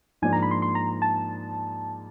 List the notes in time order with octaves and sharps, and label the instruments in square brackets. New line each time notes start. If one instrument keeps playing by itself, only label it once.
[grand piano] G#2 F3 A#3 D4 [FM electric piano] G#5
[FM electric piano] A#5
B5
C6
C6
A#5
A5